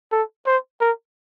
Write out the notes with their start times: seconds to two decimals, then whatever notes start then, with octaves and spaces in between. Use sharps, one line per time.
0.12 A4
0.46 C5
0.81 A#4